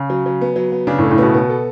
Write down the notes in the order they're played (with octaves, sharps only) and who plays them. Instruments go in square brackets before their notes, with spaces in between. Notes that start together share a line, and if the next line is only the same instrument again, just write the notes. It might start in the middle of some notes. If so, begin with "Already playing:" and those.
Already playing: [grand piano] C#3
[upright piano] F#3
F#3
B3
F#3
B3
[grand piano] C#3 [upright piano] D4
[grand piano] A2
[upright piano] A4
[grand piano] A2
[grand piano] B2 [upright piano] B3
[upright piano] B3
A4